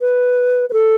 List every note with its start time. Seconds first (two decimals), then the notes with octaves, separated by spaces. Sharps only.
0.01 B4
0.70 B4
0.73 A4